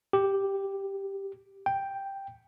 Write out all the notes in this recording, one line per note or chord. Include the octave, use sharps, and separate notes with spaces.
G4
G5